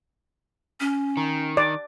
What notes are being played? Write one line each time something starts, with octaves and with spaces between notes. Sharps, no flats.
C#4
D#3
D5